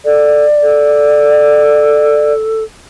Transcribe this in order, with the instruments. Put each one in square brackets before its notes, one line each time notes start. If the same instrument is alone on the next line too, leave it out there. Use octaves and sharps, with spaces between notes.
[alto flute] A4 [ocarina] D5
[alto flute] A4